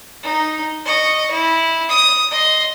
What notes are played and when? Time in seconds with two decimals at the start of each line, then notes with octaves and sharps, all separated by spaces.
0.22 D#4
0.85 D#5 C#6
1.31 E4
1.89 D#6
2.31 D#5 C6